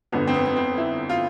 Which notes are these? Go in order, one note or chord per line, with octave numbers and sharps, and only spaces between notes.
G1 F2 D3 B3
C4
B3
B3
C4
E4
F4